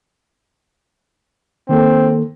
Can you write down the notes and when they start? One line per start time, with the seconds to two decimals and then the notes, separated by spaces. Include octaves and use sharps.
1.69 D#3 A#3 C4 A4